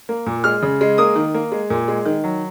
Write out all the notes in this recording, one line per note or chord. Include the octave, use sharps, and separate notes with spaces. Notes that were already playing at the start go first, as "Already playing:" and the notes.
A#3
A#2
G#3 F6
C#3
G#3
A#3 D#6
D#3
A#3
G#3
A#2
G#3
D#3
F#3